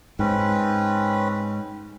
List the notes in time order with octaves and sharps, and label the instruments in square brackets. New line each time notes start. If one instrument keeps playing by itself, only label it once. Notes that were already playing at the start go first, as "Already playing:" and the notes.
[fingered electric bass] G#2 [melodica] C4 C#4 B4